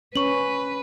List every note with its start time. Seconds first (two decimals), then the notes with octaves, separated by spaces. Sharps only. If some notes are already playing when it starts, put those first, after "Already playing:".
0.16 C#4 B4 C#6 F#7